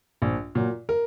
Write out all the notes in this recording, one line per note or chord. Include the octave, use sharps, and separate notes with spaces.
A#1
A#2 F#3
A#4